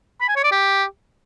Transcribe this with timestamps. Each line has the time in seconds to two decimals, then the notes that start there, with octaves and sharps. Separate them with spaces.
0.21 B5
0.28 G#5
0.36 C#5
0.44 D5
0.51 G4